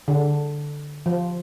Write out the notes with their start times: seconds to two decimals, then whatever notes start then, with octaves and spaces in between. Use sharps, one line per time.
0.08 D3
1.06 F3